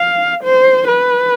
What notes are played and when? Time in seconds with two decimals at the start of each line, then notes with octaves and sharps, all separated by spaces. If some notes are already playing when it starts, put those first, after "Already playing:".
Already playing: F5
0.43 C5
0.88 B4